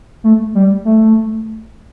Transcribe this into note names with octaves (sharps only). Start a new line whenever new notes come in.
A3
G3
A3